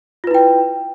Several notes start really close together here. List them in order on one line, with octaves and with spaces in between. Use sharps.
F4 B4 E4 G5